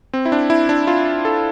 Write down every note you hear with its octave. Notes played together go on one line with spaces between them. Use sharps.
C4
E4
D4
E4
D4
F4
A4